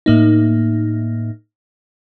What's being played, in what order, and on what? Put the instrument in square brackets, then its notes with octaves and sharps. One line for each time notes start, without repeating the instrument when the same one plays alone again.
[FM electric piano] A2 A#3 D#4